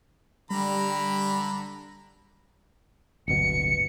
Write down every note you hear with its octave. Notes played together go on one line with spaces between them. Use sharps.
D3 G3 A#5 B5
D1 G1 B2 C#7